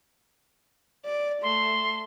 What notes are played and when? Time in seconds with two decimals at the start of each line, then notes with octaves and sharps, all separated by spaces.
1.05 D5
1.43 A3 C6